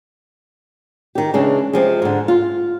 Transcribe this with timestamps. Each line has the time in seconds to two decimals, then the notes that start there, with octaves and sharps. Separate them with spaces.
1.15 D#3 G4
1.34 C#3 E3 G#3 D4
1.73 C3 F3 G#3
2.02 G#2 D3
2.28 F4